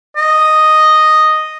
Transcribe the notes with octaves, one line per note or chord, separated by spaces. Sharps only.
D#5